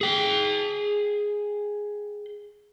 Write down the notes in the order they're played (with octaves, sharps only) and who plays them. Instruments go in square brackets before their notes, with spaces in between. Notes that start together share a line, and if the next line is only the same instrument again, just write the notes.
[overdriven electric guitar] G#4 G5